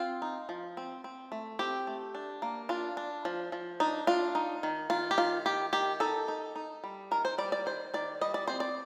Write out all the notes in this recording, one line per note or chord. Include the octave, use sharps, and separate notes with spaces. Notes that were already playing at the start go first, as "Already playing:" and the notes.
Already playing: C4 F4
D#4
F3
C4
C4
A3
C4 G4
A3
D4
A#3
D4 F4
D4
F3
F3
D4 D#4
D4 F4
D#4
D#3
D#3 F4
G4
D#3 F4
D#3 G4
D#3 G4
D#4 A4
D#4
D#4
G3
D#3 A#4
C5
G3 D5
D5
D#3 C5
D#3 D5
G3 D#5
D5
C4 C5
D5